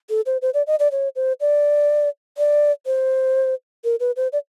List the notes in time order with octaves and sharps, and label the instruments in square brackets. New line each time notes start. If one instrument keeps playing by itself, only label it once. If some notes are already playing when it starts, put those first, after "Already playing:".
[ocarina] A4
C5
C5
D5
D#5
D5
C#5
C5
D5
D5
C5
A#4
B4
C5
D5